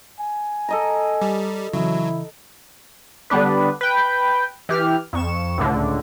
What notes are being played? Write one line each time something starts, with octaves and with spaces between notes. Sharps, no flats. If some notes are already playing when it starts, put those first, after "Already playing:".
G#5
A4 D#5 A#5
G3
C#3 E3 F#3 E4
D3 G3 B3 D4 B4
B4 G5
E3 G4 F6
F2 C#6 E7
C#2 A2 D3